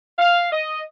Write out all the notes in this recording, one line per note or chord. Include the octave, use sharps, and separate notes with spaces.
F5
D#5